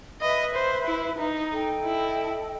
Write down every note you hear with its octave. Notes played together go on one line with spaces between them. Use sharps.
B4 D#5 E5 B5
C5
E4
D#4
A4 D#5 G5
E4